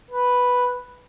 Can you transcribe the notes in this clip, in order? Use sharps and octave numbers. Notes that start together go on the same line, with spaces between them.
B4